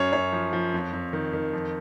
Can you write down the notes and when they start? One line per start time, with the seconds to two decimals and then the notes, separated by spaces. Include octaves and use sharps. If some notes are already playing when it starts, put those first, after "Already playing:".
Already playing: F#2 C#5
0.13 F#2 C#5
0.33 F3
0.53 F3
0.74 F2
0.93 F2
1.13 D#3
1.33 D#3
1.53 F2